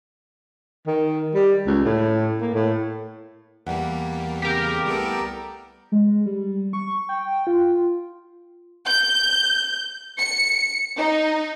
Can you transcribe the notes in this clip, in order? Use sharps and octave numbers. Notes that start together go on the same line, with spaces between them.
D#3
G3
C#2
A2
A#3
A2
E2 E3 G3 A#3 F#5
C#3 C4 G4 A#4
C2 G3 A3 B3 A4 D6
G#3
G3
C#6
G5
F4
G6
C#7
D#4